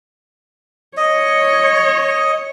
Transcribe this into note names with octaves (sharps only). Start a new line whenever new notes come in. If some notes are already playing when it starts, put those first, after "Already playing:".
C#5 D#5